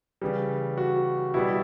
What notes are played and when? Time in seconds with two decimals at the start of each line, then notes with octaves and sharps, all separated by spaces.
0.22 C#3 E3 G3
0.78 F#4
1.34 B2 G3 E4